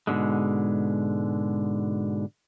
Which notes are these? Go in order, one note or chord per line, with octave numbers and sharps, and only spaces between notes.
G#2 B2 D3 G#3